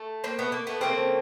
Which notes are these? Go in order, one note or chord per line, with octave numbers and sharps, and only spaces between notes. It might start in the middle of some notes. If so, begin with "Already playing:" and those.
Already playing: A3
A#3 C4
A3 B3
A#3
A3 B3
C#3 F3 A3 A#3 C4